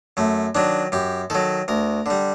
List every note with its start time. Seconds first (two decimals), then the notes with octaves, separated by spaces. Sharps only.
0.17 F#2 A3
0.55 D#3 F#3 D4
0.92 F#2 G4
1.30 D#3 F#3 A4
1.68 D2 A#4
2.06 D3 G3